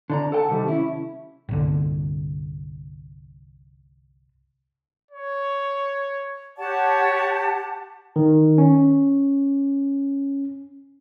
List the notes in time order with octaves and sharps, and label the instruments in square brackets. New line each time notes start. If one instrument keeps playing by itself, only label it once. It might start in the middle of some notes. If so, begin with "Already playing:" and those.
[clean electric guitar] D3 D5 A#5
A4 F#5 G5 A5
C3 D#3 G3
C#4 E4
[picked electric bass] G1 C2 D3
[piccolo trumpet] C#5
[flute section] G4 F#5 A5 [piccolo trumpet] C#5
[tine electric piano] D#3
C#4